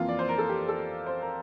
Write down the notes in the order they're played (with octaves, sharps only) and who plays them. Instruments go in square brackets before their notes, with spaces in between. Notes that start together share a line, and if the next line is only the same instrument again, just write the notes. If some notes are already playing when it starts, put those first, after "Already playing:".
Already playing: [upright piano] F2 E3 A#3 F4
D5
C5
A#4
A4
G4
A4
C5
A#4